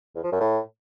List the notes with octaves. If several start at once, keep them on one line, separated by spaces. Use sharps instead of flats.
E2
F3
F#2
A2